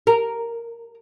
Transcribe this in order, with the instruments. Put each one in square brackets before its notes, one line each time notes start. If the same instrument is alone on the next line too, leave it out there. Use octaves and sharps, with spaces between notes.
[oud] A#4